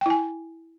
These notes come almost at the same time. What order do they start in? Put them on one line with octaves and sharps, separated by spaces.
G5 E4 G#5